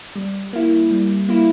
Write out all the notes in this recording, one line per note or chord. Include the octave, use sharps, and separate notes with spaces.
G3
A#3 E4
G3
A#3 E4